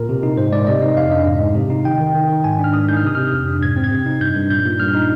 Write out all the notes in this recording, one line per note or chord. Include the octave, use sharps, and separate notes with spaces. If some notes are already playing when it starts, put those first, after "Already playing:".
Already playing: A#2 A#4
C3
D#4
G#2 C5
G#2 D5
C3 D#5
D#4
F2 F5
D4 D#5
G#2
G#2
C3
D#4
D#3 G5
D#3
D#3
D#3
G#2 G#5
D4
F6
G#2 D#6
D#4 G6
F6
C3 D#6
C3 F6
F2
D4
G#2 G#6
C4
G#6
C3
D#4
G2 G6
G2
A#2 G6
A#2
G2 F6
D#4